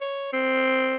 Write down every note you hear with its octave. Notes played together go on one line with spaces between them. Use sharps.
C#5
C4